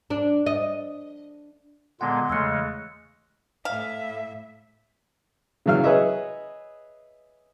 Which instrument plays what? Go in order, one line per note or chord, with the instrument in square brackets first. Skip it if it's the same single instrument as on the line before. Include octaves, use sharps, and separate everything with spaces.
[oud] D4
D#5
[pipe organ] A#2 D3 G#3 [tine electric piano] B3 F#5 [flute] C6
[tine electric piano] E2 E3 A3 [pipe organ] C#3 G#3 [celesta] E6 F#6 C#7
[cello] A2 E5 [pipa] F5
[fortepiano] C#3 E3 F#3 F5 F6
G#4 B4 C#5 D#5 E5